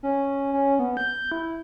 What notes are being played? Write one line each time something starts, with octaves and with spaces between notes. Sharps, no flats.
C#4
C#4
B3
G6
E4